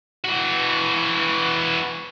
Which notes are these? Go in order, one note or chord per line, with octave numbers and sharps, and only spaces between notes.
E3 F#4